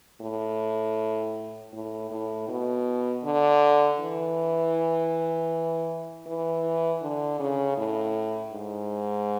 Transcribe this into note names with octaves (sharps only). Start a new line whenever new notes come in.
A2
A2
A2
B2
D3
E3
E3
D3
C#3
A2
G#2